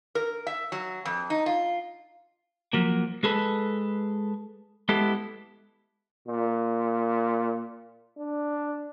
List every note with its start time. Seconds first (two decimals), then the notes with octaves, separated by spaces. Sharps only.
0.15 A#4
0.47 E5
0.72 F#3
1.05 F2
1.30 D#4
1.46 F4
2.73 F3 F#3 A#3
3.23 G#3 G#4 A4 B4
4.89 G#3 B3 E4 G4 A4
6.28 A#2
8.18 D4